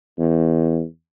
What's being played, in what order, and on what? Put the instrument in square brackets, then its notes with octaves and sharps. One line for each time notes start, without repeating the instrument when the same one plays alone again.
[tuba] E2